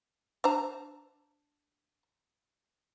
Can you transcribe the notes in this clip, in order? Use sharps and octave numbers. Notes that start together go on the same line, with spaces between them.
D4 C5 A#5